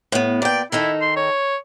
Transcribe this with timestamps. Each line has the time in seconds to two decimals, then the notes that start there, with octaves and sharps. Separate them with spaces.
0.12 A2 B3
0.42 A#2 D5 G5
0.72 D#3 D#4 E4 A4
1.02 C6
1.17 C#5